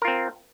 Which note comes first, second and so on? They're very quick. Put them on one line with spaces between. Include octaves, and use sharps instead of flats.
A#4 F4 C4